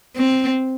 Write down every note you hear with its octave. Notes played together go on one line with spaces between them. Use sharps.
C4